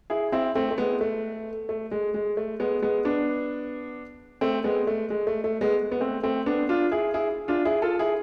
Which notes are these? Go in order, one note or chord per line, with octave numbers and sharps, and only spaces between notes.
E4 G#4
C4 E4
A3 C4
A3
G#3 B3
A3
A3
G#3
G#3
A3
G#3 B3
G#3 B3
B3 D4
A3 C4
G#3 B3
A3
G#3
A3
A3
G#3 B3
B3
A3 C4
A3 C4
B3 D4
D4 F4
E4 G#4
E4 G#4
D4 F4
E4 G#4
F4 A4
E4 G#4